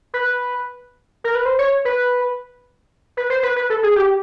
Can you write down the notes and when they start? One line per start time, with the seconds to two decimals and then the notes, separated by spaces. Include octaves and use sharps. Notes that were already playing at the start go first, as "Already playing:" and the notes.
0.14 B4
1.24 A#4
1.35 B4
1.45 C5
1.59 C#5
1.85 B4
3.17 B4
3.30 C5
3.43 B4
3.56 B4
3.70 A4
3.83 G#4
3.96 G4